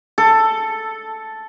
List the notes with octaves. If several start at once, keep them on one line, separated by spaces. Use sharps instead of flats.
A4